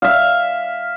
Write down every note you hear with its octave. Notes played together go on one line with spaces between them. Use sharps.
E5 F5